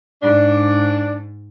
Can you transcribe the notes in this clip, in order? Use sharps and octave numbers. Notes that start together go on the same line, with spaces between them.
G#2 D4